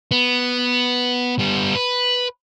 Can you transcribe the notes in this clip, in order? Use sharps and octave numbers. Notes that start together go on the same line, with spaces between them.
B3
G3 B3
B4